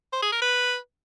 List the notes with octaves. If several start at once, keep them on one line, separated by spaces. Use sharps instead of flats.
C5
G#4
A#4
B4